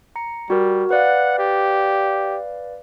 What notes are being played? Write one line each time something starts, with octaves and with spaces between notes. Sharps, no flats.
A#5 C#7
G3 F#4 A#4
B4 D5 F5 F#5
G4